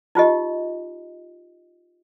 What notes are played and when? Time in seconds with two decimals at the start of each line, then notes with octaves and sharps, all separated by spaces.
0.15 D#4 F4 G4 D#5